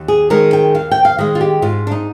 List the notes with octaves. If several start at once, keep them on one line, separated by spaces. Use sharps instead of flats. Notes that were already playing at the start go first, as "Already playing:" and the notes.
Already playing: D#2
G#4
D#3 G#3 A#4
G5
D#2 F5
G5
F5
D#3 G#3 D#5
F4
G4
G#2 F4
D4
D#4